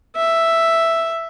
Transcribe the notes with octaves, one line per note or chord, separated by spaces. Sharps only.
E5